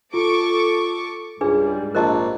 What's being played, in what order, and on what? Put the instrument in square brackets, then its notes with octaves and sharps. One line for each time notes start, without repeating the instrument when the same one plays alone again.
[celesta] F4 [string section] A4 C#6 D6
[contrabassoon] C#2 [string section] G#2 G3 [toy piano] D4 G#4 B4 [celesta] G#5
[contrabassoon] A#1 [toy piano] A#4 D#5 A5 [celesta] F#6